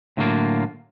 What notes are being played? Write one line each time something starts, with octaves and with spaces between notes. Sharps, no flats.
A2 D3 F#3 G#3 A#3 F4